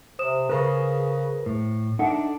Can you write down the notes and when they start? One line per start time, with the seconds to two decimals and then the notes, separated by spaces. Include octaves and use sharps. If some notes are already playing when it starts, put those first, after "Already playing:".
0.19 C3 C5 D#6 E7
0.49 C#3 G#4 A#4 B4
1.46 A2
1.99 D4 D#4 A4 E5 F#5